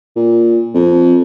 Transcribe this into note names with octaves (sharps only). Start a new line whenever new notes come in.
A#2
F2